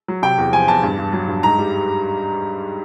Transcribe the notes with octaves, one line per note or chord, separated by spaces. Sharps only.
F#3
C3 G5
E2
F3 G#5
E2 A5
G2
G2
F#3
G2
G#2 A#5
G3